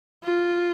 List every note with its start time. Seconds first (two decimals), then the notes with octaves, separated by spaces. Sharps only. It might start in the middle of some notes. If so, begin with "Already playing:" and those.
0.24 F4